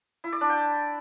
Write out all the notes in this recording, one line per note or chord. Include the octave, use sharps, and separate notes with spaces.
E4
D5
D4
G5